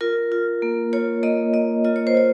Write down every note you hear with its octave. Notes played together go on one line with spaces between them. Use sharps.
F4 A#4
F4
A#3
F4 C#5
A#3 D#5
A#3 D#5
F4 D#5
C#5
C5
F4 C#5